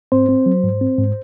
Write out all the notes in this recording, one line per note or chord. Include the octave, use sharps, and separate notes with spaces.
G#2 C4 C5
C4
F#3
G#2
C4
G#2